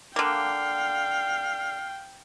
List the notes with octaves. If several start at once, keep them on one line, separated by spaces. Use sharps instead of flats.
D3 A#3 F5 G5